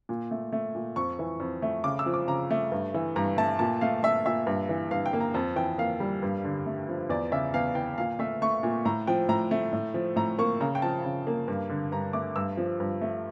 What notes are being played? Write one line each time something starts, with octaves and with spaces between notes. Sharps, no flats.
A#2
A3
A3
A#2
F2 C#6
E3
F2
A3
C#3 D6
E6
F3
D6
C#3 A#5
A3
G2
E3
G2 A#5
A3 A5
A#2 A5
A3 F5
A3 E5
A#2 E5
G2
E3
G2 F5
G5
A#3
A#5
F2 A5
E3 G5
A#3 F5
G3
G2
D3
A3
F3
E2 D5
C#3 E5
E2 F5
E3 G5
A#2 F5
A3 E5
A3 C#6
A#2
A2 A#5
F3 G5
A2 A#5
A3
A2
F3
A2 A#5
A#3 C#6
C#3 A#5
G5
F3 A5
C#3
A#3
G2
D3
G2 A#5
A3 D6
G2 E6
F3
G2
A3